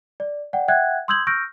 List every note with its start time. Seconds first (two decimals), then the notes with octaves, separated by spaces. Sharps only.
0.20 D5
0.53 D5 F#5 G5
0.68 E5 F#5 G5 F#6 G#6
1.08 C6 D#6 E6 G6 G#6 F#7
1.27 C#6 E6 F6 G6 A#6 D7